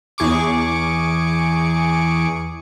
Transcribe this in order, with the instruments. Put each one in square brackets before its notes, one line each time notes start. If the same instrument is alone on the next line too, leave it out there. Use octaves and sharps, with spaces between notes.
[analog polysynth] E2 G#4 C#6 D6